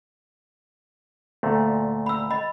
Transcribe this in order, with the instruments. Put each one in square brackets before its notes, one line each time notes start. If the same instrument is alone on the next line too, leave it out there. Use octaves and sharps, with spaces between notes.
[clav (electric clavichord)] D2 A#2 A3
[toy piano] B5 E6
D#5 B5